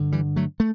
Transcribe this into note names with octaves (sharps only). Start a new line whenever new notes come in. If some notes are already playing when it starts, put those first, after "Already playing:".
Already playing: G2 D3
E3 G3
F#3 A3
A3